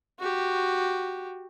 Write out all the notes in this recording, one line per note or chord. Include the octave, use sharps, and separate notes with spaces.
F#4 G4